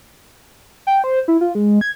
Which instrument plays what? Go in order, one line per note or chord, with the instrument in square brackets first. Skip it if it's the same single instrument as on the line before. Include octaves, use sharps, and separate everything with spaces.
[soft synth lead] G5
C5
E4
F4
G#3
G#6